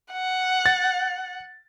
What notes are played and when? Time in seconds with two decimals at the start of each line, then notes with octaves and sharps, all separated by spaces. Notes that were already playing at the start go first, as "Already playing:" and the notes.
0.12 F#5
0.66 A6